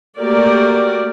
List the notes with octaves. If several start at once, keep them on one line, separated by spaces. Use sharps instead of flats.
A3 A#3 F#4 G4 A#4 D5